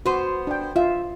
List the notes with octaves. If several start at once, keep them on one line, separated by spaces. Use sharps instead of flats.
B3 F#4 C5
D4 G5
F4 E5